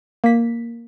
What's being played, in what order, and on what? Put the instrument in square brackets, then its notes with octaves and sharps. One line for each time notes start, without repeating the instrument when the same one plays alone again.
[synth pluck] A#3 B6